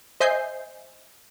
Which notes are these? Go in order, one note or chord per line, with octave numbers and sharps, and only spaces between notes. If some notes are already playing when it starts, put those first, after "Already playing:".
C5 D#5 E5 G#5 G6 C7